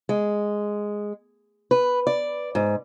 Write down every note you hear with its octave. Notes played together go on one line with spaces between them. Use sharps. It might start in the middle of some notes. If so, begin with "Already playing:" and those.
G#3
B4
D5
G#2